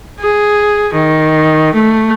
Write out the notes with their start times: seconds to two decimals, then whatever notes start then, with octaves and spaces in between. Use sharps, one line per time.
0.20 G#4
0.94 D#3
1.74 A3